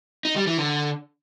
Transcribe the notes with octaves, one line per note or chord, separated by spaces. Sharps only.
D#4
G3
E3
D3